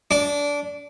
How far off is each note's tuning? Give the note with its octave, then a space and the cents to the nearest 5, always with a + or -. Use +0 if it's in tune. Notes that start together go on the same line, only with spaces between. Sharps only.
D4 -20